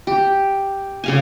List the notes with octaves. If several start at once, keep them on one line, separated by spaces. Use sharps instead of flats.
G4
C#3 F5 G#5